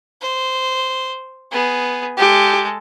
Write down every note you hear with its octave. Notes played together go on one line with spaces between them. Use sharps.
C5
B3 G#4
G#3 G4 A4